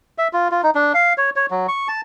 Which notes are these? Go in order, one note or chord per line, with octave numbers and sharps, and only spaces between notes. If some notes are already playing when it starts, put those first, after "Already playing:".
E5
F4
F4
D#4
D4
F5
C#5
C#5
F#3
C#6
A5